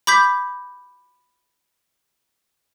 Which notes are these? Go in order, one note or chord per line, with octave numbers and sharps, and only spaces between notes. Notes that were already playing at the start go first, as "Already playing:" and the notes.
B5 D6 G6 B6